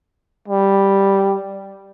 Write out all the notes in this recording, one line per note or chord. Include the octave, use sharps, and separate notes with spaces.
G3